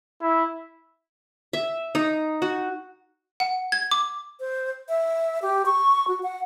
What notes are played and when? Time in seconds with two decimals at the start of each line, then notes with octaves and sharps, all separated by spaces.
0.21 E4
1.53 E5
1.95 D#4
2.42 F#4
3.40 F#5
3.72 G#6
3.91 D6
4.40 C5
4.89 E5
5.42 G4
5.66 C#6
6.08 F#4
6.23 F#5